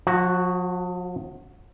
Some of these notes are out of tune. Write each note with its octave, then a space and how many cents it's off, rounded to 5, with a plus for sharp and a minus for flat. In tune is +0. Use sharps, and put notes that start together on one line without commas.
F3 +45 F#4 +0